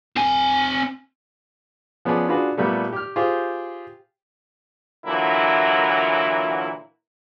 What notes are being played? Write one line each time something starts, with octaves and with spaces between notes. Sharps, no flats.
C4 G#5
F3 B3 C#4 G#4 D5
D4 F4 F#4 G#4 B4
A#2 G3 A3 B3
G4 F6
F4 G4 G#4 C5
A#2 D3 E3 F#3 E4 A#4